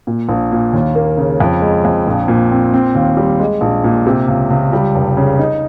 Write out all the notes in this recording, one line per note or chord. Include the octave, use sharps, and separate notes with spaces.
A#2
A#1
A#2
D#2
A#3
C#3
F2
G#3
F2
A#1
A#2
C4
C4
D#2
G3
G#3
A#1
A#2
C3
C#2
C#2
G3
F1
C#3
D#4